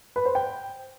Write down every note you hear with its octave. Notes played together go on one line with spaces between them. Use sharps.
B4
C5
G5